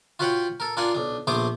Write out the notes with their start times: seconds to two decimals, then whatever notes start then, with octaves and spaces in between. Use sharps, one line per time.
0.19 F4 F#4 B4 C#5 F#5 G5
0.60 A4 A#4
0.77 D4 F4 A#4 F5 F#5 G#5
0.94 B1 D4
1.27 A#1 A3 B3 C5 D6 D#6